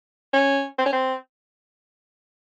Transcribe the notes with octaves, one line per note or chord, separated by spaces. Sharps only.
C#4
C4
C#4
C4